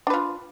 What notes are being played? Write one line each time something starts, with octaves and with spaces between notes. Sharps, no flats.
D4 F4 B4